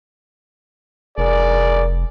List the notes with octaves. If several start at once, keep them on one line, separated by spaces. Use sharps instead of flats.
F1 G#4 A#4 D5